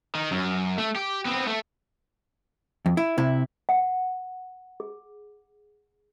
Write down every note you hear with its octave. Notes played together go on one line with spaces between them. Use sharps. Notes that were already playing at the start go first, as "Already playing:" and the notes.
D#3
F#2
A3
G4
B3 C4
A3
F2
E4
C3 E4
F#5
G#4